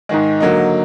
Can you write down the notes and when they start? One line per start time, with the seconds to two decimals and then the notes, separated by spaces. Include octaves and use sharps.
0.09 G#2 D#3 G#3
0.40 D3 F#3 A#3 D#4